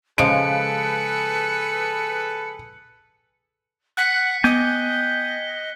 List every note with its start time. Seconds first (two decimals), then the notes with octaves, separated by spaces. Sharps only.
0.18 C#3 F3 G#3 G#4 A4 B4 C#7 D7
3.97 F#5 F#6 B6 C#7
4.44 B3 D#5 G5 G#5 D6